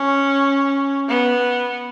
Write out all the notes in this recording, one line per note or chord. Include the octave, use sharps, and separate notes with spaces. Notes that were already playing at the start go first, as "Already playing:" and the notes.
Already playing: C#4
B3